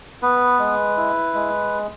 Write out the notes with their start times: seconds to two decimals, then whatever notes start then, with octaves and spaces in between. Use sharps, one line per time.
0.22 B3 B4
0.59 G#3
0.97 E4
1.35 G#3